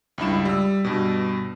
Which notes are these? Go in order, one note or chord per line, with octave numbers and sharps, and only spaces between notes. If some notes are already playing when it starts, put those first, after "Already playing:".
C#2 G2 E4 E7
G3 E6
G2 B2